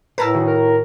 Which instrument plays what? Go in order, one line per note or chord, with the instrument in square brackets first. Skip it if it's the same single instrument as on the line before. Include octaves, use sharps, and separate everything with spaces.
[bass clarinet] A2 [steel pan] A#4 [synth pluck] B4 A5 E6
[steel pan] D#3 F#4 G#4
[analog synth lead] A#4